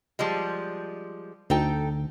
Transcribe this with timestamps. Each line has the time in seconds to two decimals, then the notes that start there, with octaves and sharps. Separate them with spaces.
0.19 F3 G3 G#3
1.50 D2 D#4 A4 G5